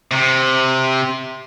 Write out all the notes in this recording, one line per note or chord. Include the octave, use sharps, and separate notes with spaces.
C3